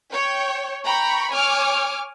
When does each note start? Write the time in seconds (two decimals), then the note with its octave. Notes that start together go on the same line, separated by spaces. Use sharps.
0.13 C#5 G5
0.84 G5 A#5 B5 C#6
1.31 C#5 G#5 D6 F6